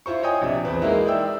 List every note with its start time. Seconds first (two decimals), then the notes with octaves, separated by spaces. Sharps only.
0.06 E4 F4 C5 C#6
0.23 C#5 D#5 G5 G#5 D#6
0.42 A#1 C3 E5
0.65 E2 C4 B4
0.81 G#3 A#3 D#4 E4 F#4
1.06 D5 E5 G5 E6